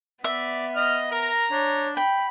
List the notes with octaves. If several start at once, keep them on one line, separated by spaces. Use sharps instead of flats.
B3 D5 E5
D#5 F6
A#4 A#5
D4 C#5
G5 B5